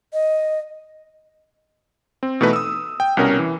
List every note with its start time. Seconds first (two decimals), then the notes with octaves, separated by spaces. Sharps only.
0.13 D#5
2.23 C4
2.41 B2 E3 A3 D#4 B4
2.53 D#6 E6
3.00 G5
3.17 C2 B2 C#4 A#4
3.38 E3